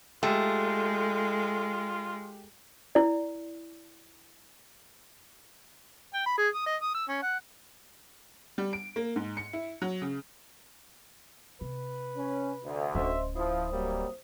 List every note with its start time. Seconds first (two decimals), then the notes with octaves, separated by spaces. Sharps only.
0.23 G#3 A3 F4 G4
2.95 E4 D5
6.14 G5
6.26 B5
6.37 G#4
6.54 D#6
6.66 D#5
6.82 D#6
6.94 E6
7.09 C#4
7.23 F#5
8.58 G3
8.73 D7
8.96 A#3
9.16 G#2
9.37 C#7
9.53 E4
9.82 F#3
10.02 C#3
11.61 C3 B4
12.16 C#4
12.64 D2
12.95 D1 C#4 C5 D#5 E5 C6
13.36 F3 E4 C5 D#6
13.72 C2 F#3 G3 A#3